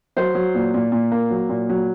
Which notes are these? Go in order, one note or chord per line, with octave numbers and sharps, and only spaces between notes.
F#3 C5
F#3
A#2
A#2
A#2
A#3
F#3
A#2
F#3